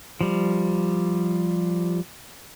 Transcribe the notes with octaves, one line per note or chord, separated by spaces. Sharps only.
F3 G3